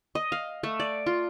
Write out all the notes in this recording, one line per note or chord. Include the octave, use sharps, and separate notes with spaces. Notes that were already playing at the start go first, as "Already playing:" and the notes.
D#5
F5
A3
D5
F4